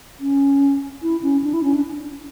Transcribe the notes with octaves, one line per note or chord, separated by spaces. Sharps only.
C#4
E4
C#4
D4
E4
C#4
D4